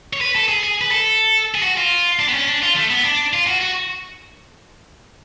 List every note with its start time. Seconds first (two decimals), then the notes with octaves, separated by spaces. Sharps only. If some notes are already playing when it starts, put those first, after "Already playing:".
0.13 C#5
0.21 B4
0.35 A4
0.49 G#4
0.63 G#4
0.81 B4
0.91 A4
1.55 G#4
1.63 F#4
1.77 F4
2.19 D4
2.29 B3
2.34 C#4
2.48 D4
2.63 F4
2.76 A3
2.90 B3
3.04 D4
3.33 F4
3.47 F#4
3.61 F#4